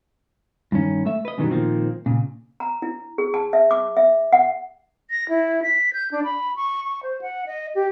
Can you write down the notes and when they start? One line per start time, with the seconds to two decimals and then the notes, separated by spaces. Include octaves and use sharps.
0.72 G2 D#3 C#4
1.06 A3 E5
1.25 B4 D#5
1.38 F#2 B2 D3 D#3 F#3 G3
1.51 A#2 D#3 F3 A#3 C4
2.06 A#2 C#3
2.60 A#5
2.82 E4
3.18 G#4
3.34 A5
3.53 E5
3.71 D6
3.97 E5
4.33 F#5
5.11 A#6
5.29 E4
5.63 B6
5.93 G6
6.12 D4
6.24 B5
6.56 C#6
6.84 C#6
7.03 C5
7.21 F#5
7.46 D#5
7.75 G4